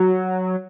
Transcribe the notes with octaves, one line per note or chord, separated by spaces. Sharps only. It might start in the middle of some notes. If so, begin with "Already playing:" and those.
Already playing: F#3